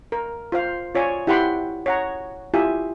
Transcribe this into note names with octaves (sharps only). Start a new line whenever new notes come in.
A#4
F4 C5 F5
F4 C#5 D5 G#5
E4 G4 F#5 G5 B5 C6
C#5 F#5 A#5
E4 F4 G4 E5 G#5